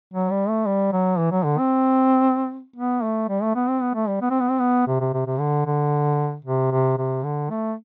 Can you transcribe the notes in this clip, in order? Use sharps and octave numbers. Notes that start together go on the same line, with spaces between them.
F#3
G3
A3
G3
F#3
E3
F#3
D3
C4
B3
A3
G3
A3
B3
C4
B3
A3
G3
B3
C4
B3
C4
B3
C3
C3
C3
C3
D3
D3
C3
C3
C3
D3
A3